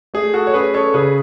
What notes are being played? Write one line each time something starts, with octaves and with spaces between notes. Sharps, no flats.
A3 G#4
F#4 A4
C#5
C#4 G#4 B4
A4 C#5
C#3 G#4 B4